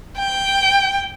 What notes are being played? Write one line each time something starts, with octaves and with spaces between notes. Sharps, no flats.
G5